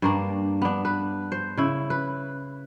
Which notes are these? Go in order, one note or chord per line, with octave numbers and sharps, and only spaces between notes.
G2 A#3 D4
B3 D4
B4
C5
C#3 E4
B4